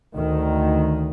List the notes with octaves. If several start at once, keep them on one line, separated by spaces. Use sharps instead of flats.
D2 D#3